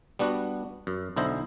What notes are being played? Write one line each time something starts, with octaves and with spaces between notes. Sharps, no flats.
G3 B3 D4 F#4
F#2
B1 D3 E4 C5 D#5